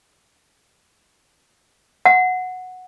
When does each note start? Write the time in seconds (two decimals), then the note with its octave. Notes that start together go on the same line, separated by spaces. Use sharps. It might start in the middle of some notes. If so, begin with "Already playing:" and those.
2.05 F#5